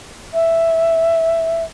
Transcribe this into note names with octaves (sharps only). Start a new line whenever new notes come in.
E5